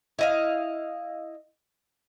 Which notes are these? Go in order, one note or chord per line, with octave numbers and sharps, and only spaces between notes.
E4 D#5 F5